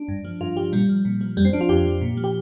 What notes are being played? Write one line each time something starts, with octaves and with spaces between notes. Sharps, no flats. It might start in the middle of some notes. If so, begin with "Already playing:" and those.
Already playing: D4
G2
F3
G2 F4
F3 G4
A#2 G3
F3
A#2
F3
F2 G3
C4
F3 D4
F4
F2 G4
F3
A#2
F3
G4